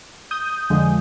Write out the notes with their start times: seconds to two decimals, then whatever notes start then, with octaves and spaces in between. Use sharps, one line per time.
0.31 D#6 G6
0.70 F2 D3 F3 G#3